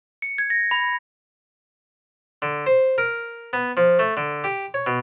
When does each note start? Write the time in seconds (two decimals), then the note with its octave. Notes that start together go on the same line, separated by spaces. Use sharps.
0.22 C#7
0.38 G#6
0.50 A#6
0.71 B5
2.42 D3
2.66 C5
2.98 A#4
3.53 B3
3.77 F3
3.99 A3
4.17 D3
4.44 G4
4.74 C#5
4.87 B2